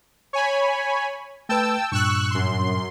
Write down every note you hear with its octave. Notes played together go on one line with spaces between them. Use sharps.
C#5 G#5 B5
A3 B4 G5 A5 E6
G2 A#2 C#6 E6 F#6
F#2 C6